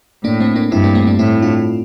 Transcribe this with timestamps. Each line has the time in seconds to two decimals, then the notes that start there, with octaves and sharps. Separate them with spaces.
0.24 A2 A#3 D4
0.40 A3 C4
0.56 A#3 D4
0.71 G2 C4 E4
0.84 A#3 D4
0.95 A3 C4
1.07 A#3 D4
1.19 A2 C4 E4
1.42 D4 F4